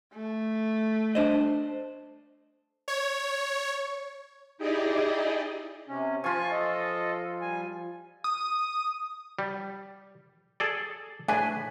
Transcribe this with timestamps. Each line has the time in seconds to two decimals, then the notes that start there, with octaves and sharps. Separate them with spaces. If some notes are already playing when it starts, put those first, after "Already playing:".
0.14 A3
1.15 D4 C5 D#5
2.88 C#5
4.58 D#4 E4 G4 G#4 D5 D#5
5.88 C3 C#4
6.24 F3 F4 G#5 C#6
6.52 A4 D#5
7.41 G3 G#5
8.24 D#6
9.39 G3
10.60 G#4 A4 D5
11.28 A2 D4 B4 G#5